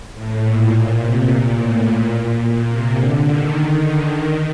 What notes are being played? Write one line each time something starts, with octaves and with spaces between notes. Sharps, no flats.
A2
A#2
A#2
C3
A#2
A2
A#2
A#2
A#2
C3
D3
D#3
D3
D#3